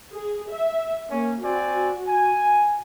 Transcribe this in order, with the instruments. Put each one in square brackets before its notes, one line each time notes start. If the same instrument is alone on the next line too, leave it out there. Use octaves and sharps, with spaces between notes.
[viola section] G#4
E5
[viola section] A#3 [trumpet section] C#4
[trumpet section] C4 D5 G#5 [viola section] F#4
[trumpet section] G#5